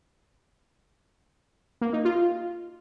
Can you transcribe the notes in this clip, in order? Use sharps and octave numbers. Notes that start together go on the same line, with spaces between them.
A#3
D#4
F4